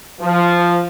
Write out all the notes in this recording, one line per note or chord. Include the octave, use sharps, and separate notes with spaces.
F3